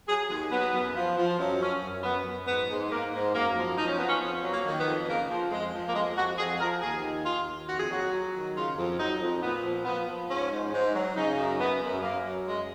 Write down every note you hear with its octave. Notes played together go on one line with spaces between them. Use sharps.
F#3 G#4
D#2 G#4
F#3 B3
F#2
F3
F3
F#2
F#2 C#4
F#2
F#2 B3
F#2
G#2 B3
G#2
G#2 A#3
G#2
F#2 A#3
F3
F3 D#4
C#4
F3 B3
C#4
F2 B3
F#3
A#3
D#3
B3
F2
C#3 A#3
F3
F2 G#3
F3
A#3
F2 G#3
F2 F#4
F2 G#4
F3 A#4
D#2 G#4
D#3
D#2 F4
D#2
F2 F#4
G#4
F#3 F#4
F#3
D#3
C#3 F4
F2
F#3 D#4
F2
A#2 B3
F3
F3 B3
F3
G#2 C#4
G#2
G#2
F#3
C#3 D#4
F#2
F#2 B3
F#2
F#2 A#3
F#3
F#2 G#3